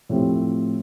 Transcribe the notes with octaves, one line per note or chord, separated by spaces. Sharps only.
A2 F3 C4 G4